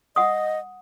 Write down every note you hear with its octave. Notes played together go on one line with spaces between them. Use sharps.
D#5 F#5 D#6